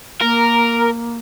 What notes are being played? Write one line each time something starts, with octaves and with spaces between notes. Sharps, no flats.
A#3 A#4